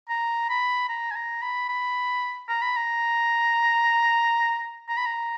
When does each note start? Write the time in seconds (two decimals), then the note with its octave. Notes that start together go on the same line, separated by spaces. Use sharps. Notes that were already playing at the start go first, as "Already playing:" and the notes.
0.09 A#5
0.49 B5
0.89 A#5
1.11 G#5
1.15 A#5
1.42 B5
1.69 B5
2.49 A#5
2.62 B5
2.76 A#5
4.88 A#5
4.97 B5
5.06 A#5